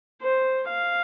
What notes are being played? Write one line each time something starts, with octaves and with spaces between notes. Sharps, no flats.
C5
F5